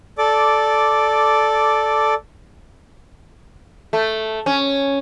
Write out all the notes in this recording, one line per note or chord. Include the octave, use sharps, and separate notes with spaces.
A4 D5 D6
A3
C#4